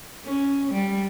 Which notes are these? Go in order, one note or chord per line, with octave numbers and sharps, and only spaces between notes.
C#4
G3